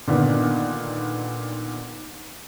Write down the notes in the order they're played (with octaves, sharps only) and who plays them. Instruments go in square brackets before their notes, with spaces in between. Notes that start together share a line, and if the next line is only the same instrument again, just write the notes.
[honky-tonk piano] A#2 D3 D#3 B3